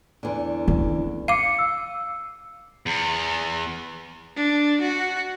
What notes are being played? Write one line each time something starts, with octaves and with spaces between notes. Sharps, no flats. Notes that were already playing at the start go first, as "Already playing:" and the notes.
E2 D3
C#4
F5 D6 C7 C#7
E6
E2
D4
F#4